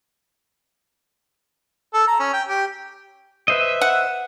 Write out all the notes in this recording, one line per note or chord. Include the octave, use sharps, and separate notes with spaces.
A4
A#5
C#4
G5
G4
B4 C5 D#5 E5
F#5